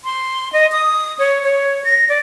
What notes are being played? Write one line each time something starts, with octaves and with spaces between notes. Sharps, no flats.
C6
D#5
D#6
C#5
C#5
A#6
D5